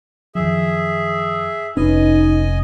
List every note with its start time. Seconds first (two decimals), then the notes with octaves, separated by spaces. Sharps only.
0.35 F#2 D#3 F3 G#4 E5
1.77 F1 C#4 D#4 B4 D#5 G#5